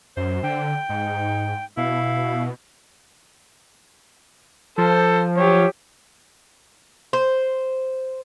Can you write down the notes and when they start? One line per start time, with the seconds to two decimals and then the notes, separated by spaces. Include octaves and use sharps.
0.17 F#2 C5
0.43 D3 G5
0.89 G#2 D#4
1.77 B2 E4 F5
4.78 F3 A4 C5
5.37 F#3 G4 C#5
7.13 C5